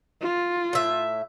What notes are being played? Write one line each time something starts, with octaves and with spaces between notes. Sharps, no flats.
F4
A2 E5